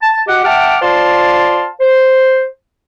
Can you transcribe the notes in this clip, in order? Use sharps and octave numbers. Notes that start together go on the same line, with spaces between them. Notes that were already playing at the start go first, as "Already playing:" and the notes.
A5
F#4 G4 D#5 F#5
E5 F#5 G5 A5 D6 F6
F4 C5 D5 F5 A5 C6
C5